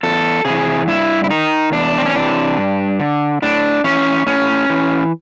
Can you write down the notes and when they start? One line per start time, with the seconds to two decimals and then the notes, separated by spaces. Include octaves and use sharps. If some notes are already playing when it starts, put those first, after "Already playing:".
0.03 E2 A4
0.45 C3 E3 G#4
0.87 G2 E4
1.24 E4
1.30 D#3 D#4
1.72 E2 D4
1.98 C4
2.06 C#4
2.15 C3 E3 D4
2.57 G2
3.00 D3
3.42 A2 D4
3.84 E3 C#4
4.27 A2 C#4
4.70 E3